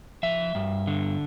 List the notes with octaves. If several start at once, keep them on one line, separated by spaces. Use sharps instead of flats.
F3 E5
G2
D3